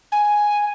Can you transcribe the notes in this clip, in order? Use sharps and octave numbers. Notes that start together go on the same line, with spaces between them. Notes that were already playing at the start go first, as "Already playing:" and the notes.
G#5